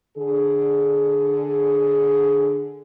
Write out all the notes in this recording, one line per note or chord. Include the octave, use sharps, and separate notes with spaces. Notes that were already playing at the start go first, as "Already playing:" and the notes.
D3 G#4